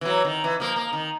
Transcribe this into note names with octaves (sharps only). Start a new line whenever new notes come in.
E3 F#3
D#3
E3
F3 A#3
A#3
D#3